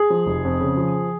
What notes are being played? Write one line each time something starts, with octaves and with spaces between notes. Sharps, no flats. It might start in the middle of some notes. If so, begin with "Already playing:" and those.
Already playing: G#4
F3
F1
F2
C#3
F3